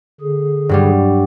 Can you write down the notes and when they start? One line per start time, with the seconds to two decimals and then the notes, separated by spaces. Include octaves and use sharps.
0.21 D3 G#4
0.69 G2 F#3 G3